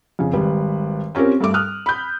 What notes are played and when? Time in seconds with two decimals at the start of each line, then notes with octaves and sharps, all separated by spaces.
0.19 F2 C#3
0.33 G#1 G3 B4
1.15 C4 C#4 F4 G4 A#4
1.40 G2 A3 D6
1.54 D#6 F6 F#6
1.86 B5 G6